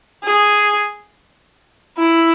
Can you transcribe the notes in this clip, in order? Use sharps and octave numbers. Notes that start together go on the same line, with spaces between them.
G#4
E4